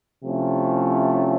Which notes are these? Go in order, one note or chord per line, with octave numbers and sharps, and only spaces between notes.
C3 F3 A3 C#4 E4